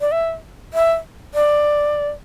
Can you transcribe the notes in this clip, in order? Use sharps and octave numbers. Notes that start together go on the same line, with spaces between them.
D5
E5
E5
D5